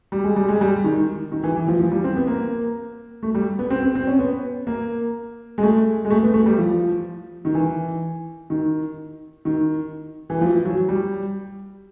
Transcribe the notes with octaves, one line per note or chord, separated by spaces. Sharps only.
G3
G#3
G3
G#3
G3
D#3
D#3
E3
E3
F3
F3
G3
C4
B3
A#3
A3
G3
B3
C4
C4
C4
C#4
B3
A#3
G#3
A3
G#3
A3
B3
A3
G3
F3
D#3
E3
D#3
D#3
E3
F3
F#3
G3